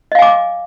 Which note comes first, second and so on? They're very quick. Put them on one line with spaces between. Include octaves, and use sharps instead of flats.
D#5 F5 G#5 D6